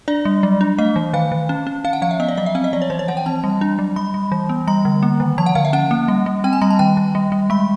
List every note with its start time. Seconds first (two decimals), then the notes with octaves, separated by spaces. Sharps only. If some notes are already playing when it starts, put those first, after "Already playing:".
0.08 D4 D5
0.25 G3
0.43 F#3
0.61 D4
0.78 A3 D#5
0.96 E3
1.13 D#3 F5
1.32 D#3
1.49 C#4
1.67 C#4
1.84 C#4 F5
1.93 F#5
2.02 F3 F5
2.11 E5
2.20 B3 D#5
2.29 D5
2.37 F#3 D#5
2.46 E5
2.55 C4 F5
2.64 D#5
2.73 F3 D5
2.82 C#5
2.90 E3 C5
2.99 C#5
3.08 E3 F#5
3.17 G5
3.26 C4 A5
3.44 G3
3.61 D4
3.79 F#3
3.96 G3 B5
4.14 G3
4.32 E3
4.49 B3
4.67 G3 A#5
4.85 D3
5.03 A#3
5.20 D#3
5.38 F3 A5
5.46 F#5
5.55 D3 F5
5.65 E5
5.73 C#4 F#5
5.91 A#3
6.08 G3
6.26 G3
6.44 C4 G5
6.53 G#5
6.61 G3 A#5
6.70 A5
6.79 D#3 G5
6.97 D#3
7.15 G3
7.32 G3
7.50 G#3 B5